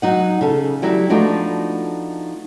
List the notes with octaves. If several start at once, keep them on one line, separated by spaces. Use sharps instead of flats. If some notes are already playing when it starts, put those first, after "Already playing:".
F#3 D#4 F#5
C#3 A4
F#3 G3 E4
F3 A3 B3 D4 D#4 F#4